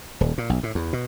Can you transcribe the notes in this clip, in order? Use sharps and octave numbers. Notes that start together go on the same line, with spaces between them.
D#1
A#2
B1
A2
E2
B2